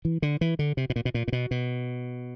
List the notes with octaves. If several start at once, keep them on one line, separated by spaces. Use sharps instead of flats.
E3
D3
E3
D3
C3
B2
A#2
B2
A#2
A#2
B2
B2